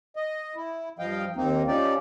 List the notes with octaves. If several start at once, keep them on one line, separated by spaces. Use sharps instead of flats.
D#5
E4
G2 F3 D#5 F5 G5
D#2 A#3 C4 D#4
F3 C#4 D#4 G4 D5